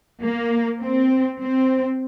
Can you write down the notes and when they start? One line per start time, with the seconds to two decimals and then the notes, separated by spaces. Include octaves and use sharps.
0.22 A#3
0.82 C4
1.41 C4